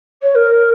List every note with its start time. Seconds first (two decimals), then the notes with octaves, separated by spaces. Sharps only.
0.22 C#5
0.35 A#4